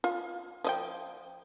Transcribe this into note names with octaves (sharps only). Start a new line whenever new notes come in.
F4
F3 D#5 G5